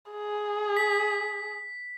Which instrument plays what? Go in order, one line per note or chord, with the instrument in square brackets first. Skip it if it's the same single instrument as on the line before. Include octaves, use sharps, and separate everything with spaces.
[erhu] G#4
[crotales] B6